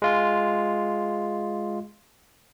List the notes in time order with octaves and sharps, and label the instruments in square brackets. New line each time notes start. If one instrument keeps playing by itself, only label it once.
[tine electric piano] G#3 F4